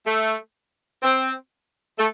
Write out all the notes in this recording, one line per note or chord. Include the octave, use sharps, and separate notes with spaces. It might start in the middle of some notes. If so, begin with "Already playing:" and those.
A3
C4
A3